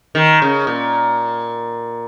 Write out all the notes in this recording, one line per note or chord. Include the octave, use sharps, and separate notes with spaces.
D#3
C#3
A#2